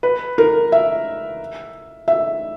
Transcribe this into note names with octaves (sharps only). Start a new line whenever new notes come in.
B4
A#4
E5
E5